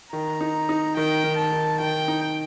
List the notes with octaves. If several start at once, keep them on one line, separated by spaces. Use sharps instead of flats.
D#3 A#5
D#4
D#4
D#3 G5
D#3
A5
D#3
D#3 G5
D#4